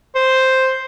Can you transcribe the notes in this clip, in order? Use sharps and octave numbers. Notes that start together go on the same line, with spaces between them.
C5